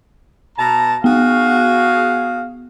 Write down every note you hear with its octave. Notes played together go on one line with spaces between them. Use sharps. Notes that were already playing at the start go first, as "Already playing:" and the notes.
B2 A5 A#5
B3 F#4 G#4 F5